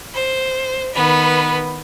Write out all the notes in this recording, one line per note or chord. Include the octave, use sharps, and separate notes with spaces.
C5
D#3 B3 B4